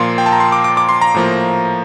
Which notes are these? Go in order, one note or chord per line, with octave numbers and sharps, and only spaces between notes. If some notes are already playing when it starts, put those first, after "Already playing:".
Already playing: A#2 F3 A#3 C6
G5
A5
A#5
C6
D6
D6
D6
C6
A#5
A2 F3 A#3